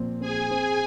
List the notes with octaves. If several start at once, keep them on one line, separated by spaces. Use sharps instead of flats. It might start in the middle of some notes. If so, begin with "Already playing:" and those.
Already playing: A#2 F3 C4
C4 G#4 G#5
C4 G#4 G#5